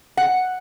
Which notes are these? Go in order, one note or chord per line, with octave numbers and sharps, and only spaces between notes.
F#5